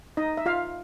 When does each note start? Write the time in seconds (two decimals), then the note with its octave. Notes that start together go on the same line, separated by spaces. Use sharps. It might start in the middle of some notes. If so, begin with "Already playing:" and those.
0.17 D#4 D#5
0.37 E5
0.46 F4 F5